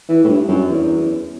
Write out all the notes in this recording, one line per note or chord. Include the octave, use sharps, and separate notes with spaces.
E3
A2
G2
F#2
E2